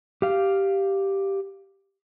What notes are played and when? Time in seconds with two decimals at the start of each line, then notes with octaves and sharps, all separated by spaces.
0.22 G4 F5